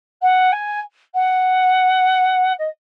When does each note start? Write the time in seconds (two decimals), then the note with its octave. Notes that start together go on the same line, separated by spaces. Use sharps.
0.22 F#5
0.52 G#5
1.14 F#5
2.58 D#5